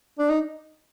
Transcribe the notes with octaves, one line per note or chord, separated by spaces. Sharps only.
D4
D#4